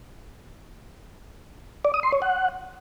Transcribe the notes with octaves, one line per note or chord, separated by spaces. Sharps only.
D5
D#6
C6
C#5
F#5